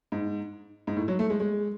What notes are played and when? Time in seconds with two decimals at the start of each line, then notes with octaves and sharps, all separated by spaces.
0.12 G#2
0.87 G#2
0.97 A2
1.08 F#3
1.19 A3
1.30 G#3
1.40 G#3